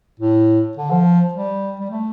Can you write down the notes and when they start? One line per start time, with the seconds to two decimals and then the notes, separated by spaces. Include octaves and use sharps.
0.20 A2
0.77 D3
0.91 F3
1.34 G3
1.80 G3
1.91 A3